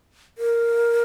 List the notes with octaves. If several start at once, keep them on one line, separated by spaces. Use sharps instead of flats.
A#4